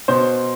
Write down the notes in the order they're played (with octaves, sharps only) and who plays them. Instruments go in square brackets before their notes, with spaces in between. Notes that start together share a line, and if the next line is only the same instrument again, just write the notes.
[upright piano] B2 C5